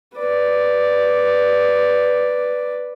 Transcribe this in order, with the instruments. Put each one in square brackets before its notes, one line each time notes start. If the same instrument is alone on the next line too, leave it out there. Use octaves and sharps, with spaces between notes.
[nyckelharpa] B4 D5